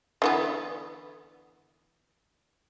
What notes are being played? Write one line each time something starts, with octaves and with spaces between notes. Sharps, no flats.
D3 E3 B3